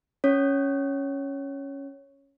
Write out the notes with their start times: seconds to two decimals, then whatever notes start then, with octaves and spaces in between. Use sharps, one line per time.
0.24 C#4 C#5